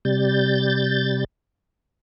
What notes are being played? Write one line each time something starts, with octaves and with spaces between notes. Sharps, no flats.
C3 G3 G6 A6